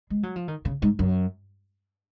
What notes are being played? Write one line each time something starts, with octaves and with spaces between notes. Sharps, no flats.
G#3
F#3
F3
D#3
C#3
G#2
F#2